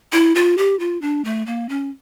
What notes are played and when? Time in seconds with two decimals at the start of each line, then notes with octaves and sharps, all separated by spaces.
0.13 E4
0.35 F4
0.58 G4
0.80 F4
1.02 D4
1.25 A3
1.47 A#3
1.69 C#4